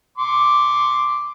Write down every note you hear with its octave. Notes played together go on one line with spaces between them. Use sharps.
C6 D6